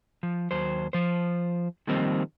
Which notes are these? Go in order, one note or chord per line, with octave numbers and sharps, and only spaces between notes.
F3
D#2 F#3 C5
F3 C5
D#3 F3 G3 A#3 C4 D#4